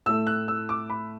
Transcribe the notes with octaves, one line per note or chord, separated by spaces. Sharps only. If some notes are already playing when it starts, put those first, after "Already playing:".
A2 A3 E6
F#6
E6
D6
B5